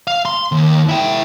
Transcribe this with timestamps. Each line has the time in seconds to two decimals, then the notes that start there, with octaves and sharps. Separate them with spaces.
0.07 F5
0.25 C6
0.52 D#2
0.89 E4 G5